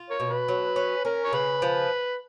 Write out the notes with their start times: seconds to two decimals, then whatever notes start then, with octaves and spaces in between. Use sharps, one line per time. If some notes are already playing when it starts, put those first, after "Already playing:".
Already playing: F4
0.10 A#4 C#5
0.20 B2
0.29 B4
0.48 F#3
0.76 C#4
1.05 C#4 A#4
1.24 C#5
1.33 C#3 B4
1.62 F3